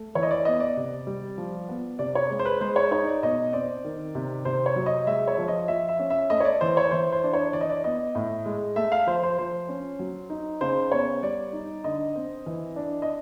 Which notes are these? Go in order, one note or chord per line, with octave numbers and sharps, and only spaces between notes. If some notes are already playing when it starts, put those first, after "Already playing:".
Already playing: A3
E3 C#5
D#5
D5
B3 D#5
D5
C3
G3
F3
B3
C3 D5
C#5
G#3
C5
B4
G#3 C5
C#5
D#4 C#5
D5
B2 D#5
C4 D5
D#3
C3
C3 C5
C#5
F#3
D#5
G#3 E5
C#5
F3
D#5
F3 E5
E5
C#4
E5
A3 D#5
C#5
D5
E3 C5
C#5
E3 C5
C5
D4
C#5
E3 D5
D#5
D5
B3 D#5
A2
G#3
A3 E5
F5
F3 C5
C5
F3 C5
C#4
F#3
D#4
C#3 C5
B3 C#5
G3 D5
D#4
D3 D#5
C4
E3
D4
D#5